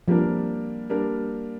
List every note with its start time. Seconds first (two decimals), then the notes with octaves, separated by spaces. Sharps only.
0.08 F3 G3 A#3 D4 A#4
0.90 G3 A#3 D4 A#4